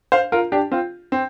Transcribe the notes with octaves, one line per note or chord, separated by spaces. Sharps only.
C5 F5
F4 A#4
D4 G4
C4 F4
C4